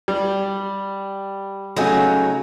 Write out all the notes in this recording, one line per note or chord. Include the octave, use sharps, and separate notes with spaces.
G3
C#3 F#3 A3 D#4 G#5